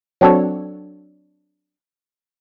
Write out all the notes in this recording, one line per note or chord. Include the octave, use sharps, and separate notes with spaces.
F#3 C4 D4 F#4 A4 C#5